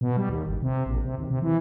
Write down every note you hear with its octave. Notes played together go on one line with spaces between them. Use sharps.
B2
G3
D#2
G1
C3
A#1
C3
D#2
C3
E3